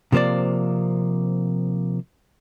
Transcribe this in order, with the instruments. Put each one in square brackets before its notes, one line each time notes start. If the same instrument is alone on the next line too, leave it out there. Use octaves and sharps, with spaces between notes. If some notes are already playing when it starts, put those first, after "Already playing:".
[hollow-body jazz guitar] C3 F3 A#3 C5 D5